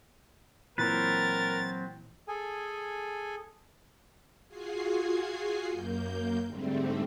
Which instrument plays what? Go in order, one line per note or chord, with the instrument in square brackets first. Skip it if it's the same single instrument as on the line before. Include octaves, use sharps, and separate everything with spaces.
[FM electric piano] A#2 E3 [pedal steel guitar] F#3 C4 B4 [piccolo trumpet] A#4 [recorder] A6
[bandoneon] G#4 A4 G#5
[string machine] F4 F#4 G#4 G#5 C7
F#2 A#3 G6
G#2 D3 G3 A3 C4